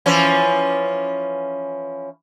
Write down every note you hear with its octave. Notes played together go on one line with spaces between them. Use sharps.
E3 F3 C#4